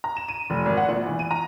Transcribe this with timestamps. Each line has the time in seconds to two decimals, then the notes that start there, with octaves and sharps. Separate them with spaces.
0.04 A#5
0.17 E7
0.28 D#7
0.50 F1
0.66 G#1
0.77 F#5
0.89 A#1
1.07 E3
1.19 D#7
1.31 A#5